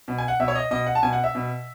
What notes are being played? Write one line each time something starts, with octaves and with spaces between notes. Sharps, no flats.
B2
G#5
F#5
B2 E5
C#5
D#5
B2 D#5
F#5
A5
B2 G#5
F#5
E5
B2